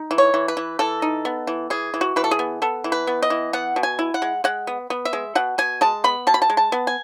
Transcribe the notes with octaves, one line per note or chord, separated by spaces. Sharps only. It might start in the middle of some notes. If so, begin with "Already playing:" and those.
Already playing: D#4
E3
C#5
E3
B4
E3
E3 A4
D#4
B3
E3
E3 G#4
E3
F#4
E3 B4
A4
G#4
B3
B3 A4
E3
B4
B3
D#5
E3
B3 F#5
B2
G#5
E4
F#5
G#3
G#3 F#5
B3
B3
E5
G#3
B2 F#5
B2 G#5
G#3 A5
B3 B5
B2 A5
B5
A5
G#3
A5
B3
G#5